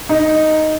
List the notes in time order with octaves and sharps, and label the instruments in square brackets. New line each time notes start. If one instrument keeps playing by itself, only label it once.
[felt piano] D#4